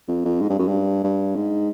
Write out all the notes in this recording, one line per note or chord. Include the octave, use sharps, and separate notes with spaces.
F2
F2
G#2
G2
F#2
G2
G2
G#2